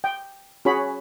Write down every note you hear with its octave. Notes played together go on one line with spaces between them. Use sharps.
G5
C#4 F#4 G#4 C#5 B5